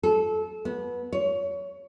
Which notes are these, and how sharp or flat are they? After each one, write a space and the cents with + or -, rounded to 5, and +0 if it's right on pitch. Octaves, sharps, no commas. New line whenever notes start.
A4 -20
B3 -20
C#5 +25